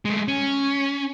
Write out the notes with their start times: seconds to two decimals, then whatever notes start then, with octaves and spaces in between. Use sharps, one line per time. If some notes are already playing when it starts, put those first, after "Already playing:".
0.05 G#3 A3
0.28 C#4